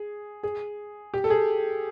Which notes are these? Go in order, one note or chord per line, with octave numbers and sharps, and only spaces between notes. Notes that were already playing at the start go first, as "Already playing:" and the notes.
Already playing: G#4
G#4
G4
A4
G#4